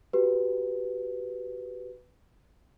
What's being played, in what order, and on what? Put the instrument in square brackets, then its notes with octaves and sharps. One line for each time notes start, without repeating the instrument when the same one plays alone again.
[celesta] F#4 G4 B4